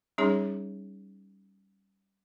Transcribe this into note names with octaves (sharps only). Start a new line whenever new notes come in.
G3 C#4 D#4 G#4 C#5